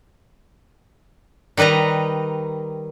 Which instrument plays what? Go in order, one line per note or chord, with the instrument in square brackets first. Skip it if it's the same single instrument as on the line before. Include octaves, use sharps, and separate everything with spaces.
[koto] D#3 G3 B4 D#5 A#5